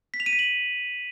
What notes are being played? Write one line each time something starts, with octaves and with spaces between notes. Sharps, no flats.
B6
F7
D#7
B6
F#7